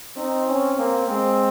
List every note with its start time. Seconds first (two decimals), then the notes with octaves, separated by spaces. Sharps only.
0.16 C4 D#4
0.47 C#4
0.77 A#3 C4
1.08 G#3 C4